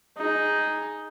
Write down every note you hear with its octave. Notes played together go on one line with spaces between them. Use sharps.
D#4 G#4